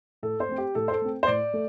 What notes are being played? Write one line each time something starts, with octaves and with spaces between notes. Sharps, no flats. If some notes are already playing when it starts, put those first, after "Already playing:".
A2 A4
C5
A3 C4
G4
A2 A4
C5
A4
A3 C4
C5
A2 D5
A3